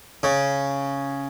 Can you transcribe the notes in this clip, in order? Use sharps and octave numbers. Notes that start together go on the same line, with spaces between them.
C#3